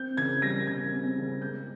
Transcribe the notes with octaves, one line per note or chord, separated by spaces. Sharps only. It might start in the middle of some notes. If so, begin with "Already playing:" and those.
Already playing: C4 G6
C#3 G#6
G3 A#6
C#3 G#6
C4
C#3
G#3 G6